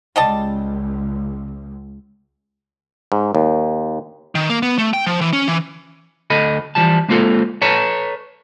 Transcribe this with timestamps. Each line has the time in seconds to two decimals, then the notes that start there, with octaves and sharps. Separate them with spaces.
0.16 C#2 G3 D#5 A5
3.12 G#2
3.35 D#2
4.35 D#3
4.50 A#3
4.62 B3
4.78 A3
4.94 G5
5.06 F3
5.21 E3
5.33 C#4
5.48 E3
6.30 D2 A4 D#5 B5
6.75 E3 F3 G3 A5
7.08 G#3 A#3 C4 F4 G#4 A4
7.62 A4 B4 C#5 A5 A#5